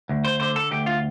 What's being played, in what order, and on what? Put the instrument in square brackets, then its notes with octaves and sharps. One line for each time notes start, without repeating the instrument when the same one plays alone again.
[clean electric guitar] D2
C5
D3 C5
A4
D2 G4
F4